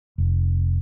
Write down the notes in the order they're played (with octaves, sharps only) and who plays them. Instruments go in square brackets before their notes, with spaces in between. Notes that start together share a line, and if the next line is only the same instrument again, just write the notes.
[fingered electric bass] F1